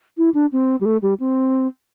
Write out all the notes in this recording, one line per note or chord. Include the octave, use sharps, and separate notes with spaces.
E4
D4
C4
G3
A3
G3
C4